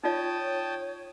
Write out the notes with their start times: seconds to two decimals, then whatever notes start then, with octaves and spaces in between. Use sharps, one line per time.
0.04 D#4 F4 C#5 D5 G5 A5 D#6